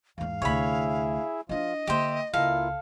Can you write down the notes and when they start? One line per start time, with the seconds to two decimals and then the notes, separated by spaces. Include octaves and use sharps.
0.18 E2 G#2 F5
0.42 D2 C3 E4 G#4 C#5 E5 B5
1.49 F3 D4 E4 F4 D#5
1.87 D3 A#3 G4 C5 E5
2.34 C#2 A#3 E4 F4 A4 F5